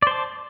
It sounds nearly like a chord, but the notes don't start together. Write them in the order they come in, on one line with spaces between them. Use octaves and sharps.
D5 C5 A5